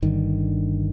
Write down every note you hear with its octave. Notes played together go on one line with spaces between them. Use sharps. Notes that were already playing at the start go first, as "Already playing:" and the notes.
G1 G2 D3 D#3